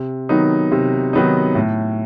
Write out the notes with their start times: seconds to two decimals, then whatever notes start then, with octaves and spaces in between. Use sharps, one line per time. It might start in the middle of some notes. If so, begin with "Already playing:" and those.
Already playing: C3
0.29 D#3 F#3 B3 D#4
0.71 C3
1.13 D#3 F#3 B3 D#4
1.55 A2